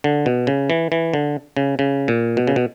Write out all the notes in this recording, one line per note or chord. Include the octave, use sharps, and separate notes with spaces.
D3
B2
C#3
E3
E3
D3
C#3
C#3
A#2
B2
C#3
B2